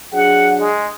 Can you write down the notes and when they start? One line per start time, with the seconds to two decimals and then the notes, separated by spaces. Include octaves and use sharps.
0.13 F#3 D4 G#4 F#5
0.60 G#3